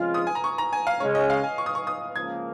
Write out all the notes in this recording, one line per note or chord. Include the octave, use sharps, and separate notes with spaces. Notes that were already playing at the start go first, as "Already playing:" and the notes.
Already playing: F2 C#3 G#3 F4 F6
D#6
G#5
A#5
C#6
A#5
G#5
F5
C#3 G#3 C#4 C#5
D#5
F5
G#5
C#6
D#6
C#6
D#6
C#2 C#3 F3 A#3 G#6